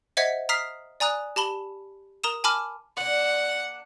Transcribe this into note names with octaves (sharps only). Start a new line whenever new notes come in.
C5 D#5 E5 F#5 G#6 B6
A#5 D#6 F6 B6 C7
D5 G#5 A#5 D#6 F#6
G4 A5 B5 G7
A#4 A#5 D#6 E7
G#5 A5 B5 D6 F6
A#3 D4 F#5